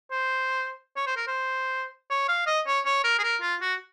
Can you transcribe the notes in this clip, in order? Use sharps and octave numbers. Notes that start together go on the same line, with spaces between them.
C5
C#5
C5
A#4
C5
C#5
F5
D#5
C#5
C#5
A#4
G#4
A#4
F4
F#4